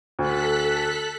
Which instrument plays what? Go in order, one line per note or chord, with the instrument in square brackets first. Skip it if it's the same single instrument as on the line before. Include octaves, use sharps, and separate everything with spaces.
[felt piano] D2 [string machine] A4 F#6 B6